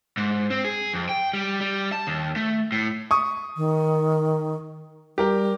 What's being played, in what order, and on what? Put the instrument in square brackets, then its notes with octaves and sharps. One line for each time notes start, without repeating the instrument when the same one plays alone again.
[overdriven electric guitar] G#2
C4
G#4
F2
G5
G3
G3
A5
D#2
A3
A2
[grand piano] C#6 D#6
[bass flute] D#3
[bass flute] G3 [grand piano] G4 A#4 G5